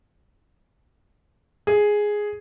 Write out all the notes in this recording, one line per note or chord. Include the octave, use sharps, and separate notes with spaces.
G#4